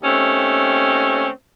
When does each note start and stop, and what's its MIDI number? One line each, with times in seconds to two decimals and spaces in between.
0.02 1.27 39
0.02 1.27 57
0.02 1.27 60
0.02 1.27 61